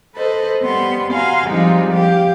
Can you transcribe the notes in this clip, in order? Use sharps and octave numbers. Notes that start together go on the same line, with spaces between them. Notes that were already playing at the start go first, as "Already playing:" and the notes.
A4 B4 C5 D#5
G3 B3 C6
F#4 F5 G#5 A#5 C6
F3 G3 G#3 C4 D#4 F4
G4 F5